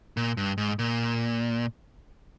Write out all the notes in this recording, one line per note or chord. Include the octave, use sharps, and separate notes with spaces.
A#2
G2
G#2
A#2